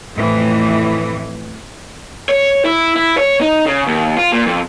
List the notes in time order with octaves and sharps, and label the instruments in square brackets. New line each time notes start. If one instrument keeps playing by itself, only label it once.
[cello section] F2 A2 E3
[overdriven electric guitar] C#5
E4
E4
C#5
D#4
C#3
D#2
F4
A#2
F2